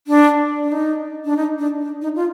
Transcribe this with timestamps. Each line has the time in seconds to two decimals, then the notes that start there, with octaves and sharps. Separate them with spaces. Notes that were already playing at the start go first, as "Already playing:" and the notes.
0.07 D4
0.63 D4
0.72 D#4
1.25 D4
1.37 D#4
1.58 D4
1.80 D4
2.02 D#4
2.15 F4